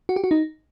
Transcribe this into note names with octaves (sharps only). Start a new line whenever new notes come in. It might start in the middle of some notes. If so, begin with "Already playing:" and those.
F#4
G4
F#4
D#4